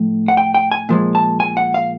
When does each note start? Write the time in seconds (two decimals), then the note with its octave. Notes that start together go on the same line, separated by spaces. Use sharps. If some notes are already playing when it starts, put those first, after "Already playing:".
Already playing: A2 F3
0.28 F#5
0.37 G5
0.54 G5
0.72 G#5
0.89 A#2 F3 G#3
1.15 A5
1.40 G#5
1.57 F#5
1.74 F5